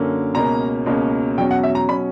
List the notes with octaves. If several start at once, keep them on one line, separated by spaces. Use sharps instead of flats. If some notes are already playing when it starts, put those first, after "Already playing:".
Already playing: F#2 D3 A#3 C#4
C#2 B2 A#3 C#4 A#5
C#2 B2 A#3 C#4
E2 B2 F#3 C#4 G5
F#5
E5
A#5
B2 F#3 C#4 B5